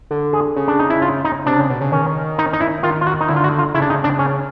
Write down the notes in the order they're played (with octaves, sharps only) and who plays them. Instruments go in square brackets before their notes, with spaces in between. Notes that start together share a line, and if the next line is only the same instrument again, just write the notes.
[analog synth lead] D3
[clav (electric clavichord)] G#4
[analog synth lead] C#3
[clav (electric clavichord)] D4
D#4
E4
F4
D#4
[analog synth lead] C3 [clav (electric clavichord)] D4
[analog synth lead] C#3
B2
C#3
[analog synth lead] D#3 [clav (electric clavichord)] C#4
[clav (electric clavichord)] D#4
D#4
E4
[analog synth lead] D#3 [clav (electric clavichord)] F4
[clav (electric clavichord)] F4
F#4
D#4
[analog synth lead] D3 [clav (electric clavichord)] E4
[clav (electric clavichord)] F4
F#4
F4
[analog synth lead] C#3 [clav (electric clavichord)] E4
[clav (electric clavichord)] D4
D#4
D4
C#4